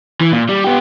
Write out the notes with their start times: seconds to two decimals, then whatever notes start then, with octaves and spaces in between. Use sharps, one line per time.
0.21 E3
0.32 A#2
0.49 G3
0.64 B3 G4